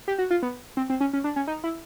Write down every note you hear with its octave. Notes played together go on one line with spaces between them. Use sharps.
G4
F#4
F4
B3
C4
C4
C#4
C#4
D4
C#4
D#4
E4